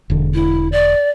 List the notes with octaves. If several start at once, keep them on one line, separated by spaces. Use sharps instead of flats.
E1 D3
E4
D5